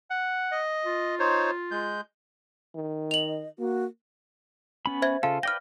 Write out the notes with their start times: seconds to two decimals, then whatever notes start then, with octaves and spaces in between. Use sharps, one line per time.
0.10 F#5
0.52 D#5
0.85 F4
1.19 D#4 C5 C#5
1.71 G#3 G6
2.75 D#3
3.11 D#5 F7 F#7
3.59 A#3 F#4
4.86 B3 C#4 B5
5.02 C5 E5 G#6
5.23 C#3 F4 A4 F5
5.43 B4 D5 G5 F6 A#6